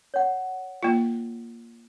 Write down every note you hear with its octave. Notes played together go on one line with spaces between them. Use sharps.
C#5 F#5
A#3 F4